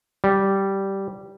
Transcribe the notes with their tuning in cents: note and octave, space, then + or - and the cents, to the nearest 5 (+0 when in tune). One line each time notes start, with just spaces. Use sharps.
G3 -10